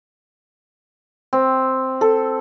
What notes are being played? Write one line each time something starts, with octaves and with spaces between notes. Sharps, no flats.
C4
A4